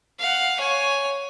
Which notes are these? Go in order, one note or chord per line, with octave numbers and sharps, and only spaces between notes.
F5 F#5
C#5 G#5